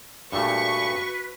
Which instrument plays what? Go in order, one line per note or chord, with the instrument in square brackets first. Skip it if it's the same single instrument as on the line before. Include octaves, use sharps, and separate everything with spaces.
[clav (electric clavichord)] G2 A#2 A3 [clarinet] F#4 [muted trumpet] B4 [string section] C#6